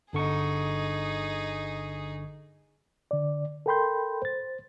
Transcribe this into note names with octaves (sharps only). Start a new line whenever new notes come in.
G1 D3 D#4 G#4 C#6
D3 D5
A4 A#4 G5 B5 C6 G6
C5 A6